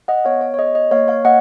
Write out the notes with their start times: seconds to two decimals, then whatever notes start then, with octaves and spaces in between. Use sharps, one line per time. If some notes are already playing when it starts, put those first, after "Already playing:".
0.08 D#5 F#5
0.25 B3 C#5 F5
0.41 C#5
0.54 C#5
0.59 G#4 D#5
0.75 D#5
0.91 A#3 C#5 F5
1.08 C#5 F5
1.25 A#3 D#5 F#5